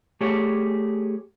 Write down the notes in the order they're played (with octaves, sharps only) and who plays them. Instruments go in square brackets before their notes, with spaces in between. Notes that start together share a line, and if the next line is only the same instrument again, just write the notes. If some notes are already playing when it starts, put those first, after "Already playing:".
[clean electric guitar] A3 G4 G#4 C#5